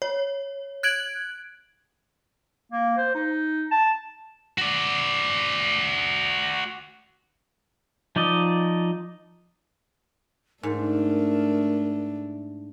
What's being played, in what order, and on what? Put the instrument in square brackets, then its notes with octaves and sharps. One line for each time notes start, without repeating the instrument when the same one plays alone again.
[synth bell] C#5
F#6 G#6 D7 F#7
[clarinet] A#3
C5
D#4
A5
[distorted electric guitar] F#4 D5
[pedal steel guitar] F3 D#4 D5 D#5
[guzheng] G#2 [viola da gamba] A3 D4 [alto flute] A#4